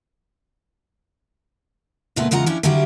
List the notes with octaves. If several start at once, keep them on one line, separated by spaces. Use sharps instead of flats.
A#2 C#3 G#3 A3 B3 B4
E2 C#3 G#3 F4 F#5 A#5
F3 C#4 D4 E4 G4
D3 F#3 G3 E4 F4 G4